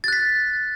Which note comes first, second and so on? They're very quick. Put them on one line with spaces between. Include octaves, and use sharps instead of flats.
A6 F#6 B6